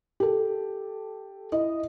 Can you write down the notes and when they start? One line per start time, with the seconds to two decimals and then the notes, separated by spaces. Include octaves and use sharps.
0.20 G4 A4
1.52 E4 D#5